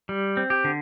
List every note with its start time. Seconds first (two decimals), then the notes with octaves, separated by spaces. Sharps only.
0.09 G3
0.37 C4
0.50 G4
0.64 D3